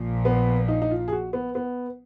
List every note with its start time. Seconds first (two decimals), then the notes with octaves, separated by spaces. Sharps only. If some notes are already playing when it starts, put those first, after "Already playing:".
Already playing: A#1 A#2 F3
0.25 B3
0.68 D#4
0.82 D#4
0.91 F4
1.08 G#4
1.12 F#4
1.33 B3
1.55 B3